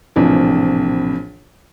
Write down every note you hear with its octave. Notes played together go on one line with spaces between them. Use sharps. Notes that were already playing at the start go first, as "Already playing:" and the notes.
A#1 A2 C3 E3 F3